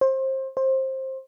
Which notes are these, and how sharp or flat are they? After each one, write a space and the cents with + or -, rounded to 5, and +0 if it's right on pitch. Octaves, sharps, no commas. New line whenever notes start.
C5 +25
C5 +20